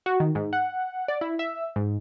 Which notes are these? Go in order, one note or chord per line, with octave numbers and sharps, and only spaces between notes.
F#4
D#3
G#2
F#5
D5
E4
E5
G#2